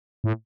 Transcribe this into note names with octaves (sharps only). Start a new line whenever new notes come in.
A2